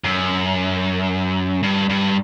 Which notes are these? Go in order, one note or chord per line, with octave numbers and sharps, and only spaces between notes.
F#2
G2
G2